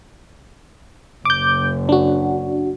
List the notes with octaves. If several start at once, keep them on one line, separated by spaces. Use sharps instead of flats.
F#1 D6 G6
D4 F#4